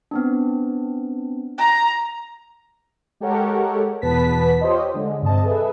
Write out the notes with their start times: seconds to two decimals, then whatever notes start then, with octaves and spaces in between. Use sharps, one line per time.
0.11 B3 C4 D4
1.58 A#5
3.20 G#3 G4 A4 A#4 C#5 F#5
4.02 E2 B2 B3 B4 A5 B6
4.61 F4 G4 C5 C#5 D#5
4.94 D3 G#3
5.22 G2 C3 D#5 A5
5.43 G#4 A4 B4 E5